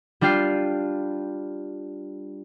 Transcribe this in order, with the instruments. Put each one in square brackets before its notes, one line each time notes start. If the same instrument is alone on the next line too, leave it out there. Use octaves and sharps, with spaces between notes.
[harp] G3 D4 F4 G5 C7